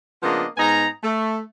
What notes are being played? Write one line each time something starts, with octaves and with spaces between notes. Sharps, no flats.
C#3 F3 A#3 B3 D4 D#5
G#2 B3 D#4 G#5 A#5
A3